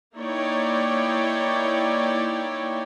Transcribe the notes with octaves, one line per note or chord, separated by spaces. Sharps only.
A#3 D#4 E4 C#5 D5 G5